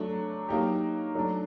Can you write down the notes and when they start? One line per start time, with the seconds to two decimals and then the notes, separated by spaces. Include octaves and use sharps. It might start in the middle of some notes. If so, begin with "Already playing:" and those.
Already playing: F#3 A3 D4
0.49 F#3 A#3 D#4 G4
1.15 F#3 A3 D4